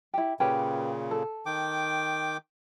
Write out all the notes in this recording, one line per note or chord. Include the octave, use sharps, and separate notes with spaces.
E4 G4
A#2 C#3 C#4 G4 B4
A4
D#3 G5 D6